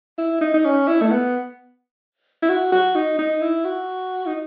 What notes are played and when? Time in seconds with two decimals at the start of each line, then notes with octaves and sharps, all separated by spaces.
0.18 E4
0.41 D#4
0.54 D#4
0.65 C#4
0.87 E4
1.02 A3
1.11 B3
2.42 E4
2.49 F#4
2.72 F#4
2.96 D#4
3.19 D#4
3.42 E4
3.65 F#4
4.26 D#4